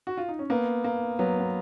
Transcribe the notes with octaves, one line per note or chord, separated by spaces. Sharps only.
F#4
F4
D#4
C#4
A#3 B3
A#3
F#3 B3
B3